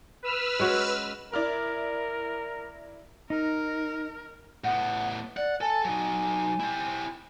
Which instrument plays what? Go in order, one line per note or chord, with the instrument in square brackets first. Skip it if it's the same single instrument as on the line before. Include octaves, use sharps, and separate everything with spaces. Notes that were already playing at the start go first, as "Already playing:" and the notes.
[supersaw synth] B4 E6 F6
[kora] G#3 C#4 F#4
[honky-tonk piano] E4 D5 F6 [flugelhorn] A#4
[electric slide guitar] D#4 [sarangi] A#4
[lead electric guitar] A2 B3 [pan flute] F#5
[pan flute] D5 [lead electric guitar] F#5
[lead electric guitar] A4 [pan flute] G#5
[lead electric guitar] F#3 D#4
E4 G4